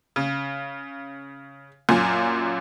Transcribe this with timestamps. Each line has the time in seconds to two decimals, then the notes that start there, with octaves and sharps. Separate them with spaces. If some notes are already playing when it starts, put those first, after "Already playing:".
0.16 C#3
1.89 F#2 A#2 F4 G#5